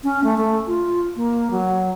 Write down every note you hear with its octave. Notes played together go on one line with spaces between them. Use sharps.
C#4
A3
A3
F4
A#3
F#3